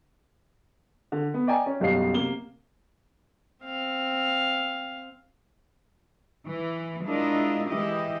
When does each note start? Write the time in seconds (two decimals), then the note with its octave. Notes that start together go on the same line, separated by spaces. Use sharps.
1.12 D3
1.34 B3
1.47 D5 D#5 G5 G#5 A#5
1.66 C#4
1.80 F#1 B1 B2 G3 F5 C7
2.14 C3 A#3 G7
3.64 C4 F5
6.46 E3
7.05 G#3 D4 E4 F4 A#4 D#5
7.68 E3 G#3 E4 G4 D#5